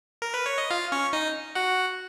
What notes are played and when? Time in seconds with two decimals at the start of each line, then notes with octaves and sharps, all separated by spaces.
0.22 A#4
0.34 B4
0.46 C#5
0.58 D#5
0.70 F4 F5
0.92 C#4 C#5
1.13 D#4 D#5
1.55 F#4 F#5